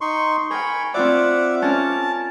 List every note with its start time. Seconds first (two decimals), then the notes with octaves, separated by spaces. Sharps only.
0.01 D#4 C6 C#6
0.51 A#4 G5 G#5 B5 C#6
0.94 C4 F4 D5 E5 F#5 D6
1.62 C#4 A#4 A5